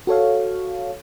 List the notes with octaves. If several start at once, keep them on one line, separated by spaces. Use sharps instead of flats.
F#4 A4 C#5 F5